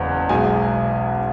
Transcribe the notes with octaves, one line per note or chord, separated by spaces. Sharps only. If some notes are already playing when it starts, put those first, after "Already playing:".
Already playing: F#1 E2 C#3 F#3 C#4
B1 B2 G#3 G#5